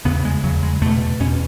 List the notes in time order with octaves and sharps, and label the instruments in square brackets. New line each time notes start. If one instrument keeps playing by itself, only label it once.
[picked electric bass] E2 C#3 B3
G#3
E2 C#3 F#3
G#3
E2 B2 A3
E2 B2 C#4